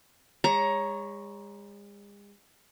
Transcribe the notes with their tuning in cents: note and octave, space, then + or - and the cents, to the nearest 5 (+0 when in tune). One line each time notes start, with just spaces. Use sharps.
G#3 -40 C#5 +0 A#5 +15